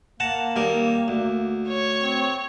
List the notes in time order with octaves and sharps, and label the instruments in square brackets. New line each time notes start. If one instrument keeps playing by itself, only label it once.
[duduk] A#3 [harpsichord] F#5 A5 A#5
[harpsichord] D#2 G3 A#4
D2
[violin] C#5
[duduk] C4